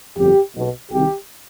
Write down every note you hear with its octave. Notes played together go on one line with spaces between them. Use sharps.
G1 F2 D3 G4
B1 B2
C2 C3 D#3 G4